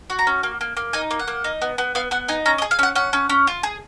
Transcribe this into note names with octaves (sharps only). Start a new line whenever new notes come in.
F#4
A#5
C#4
A#3
A#3
A#3
D#4 G#5
A#3
F#5
A#3
D#4
B3
B3
B3 F5
B3 F#5
D#4 G#5
C#4 A#5
D#5
G#4
F5
C#4 F#5
C#4 F#5
C#4
C#4
F4
G#4